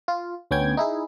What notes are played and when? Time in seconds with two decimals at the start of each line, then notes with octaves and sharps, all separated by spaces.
0.08 F4
0.51 D2 B3 C#4 G5 G#6
0.77 D#4 E4 G#4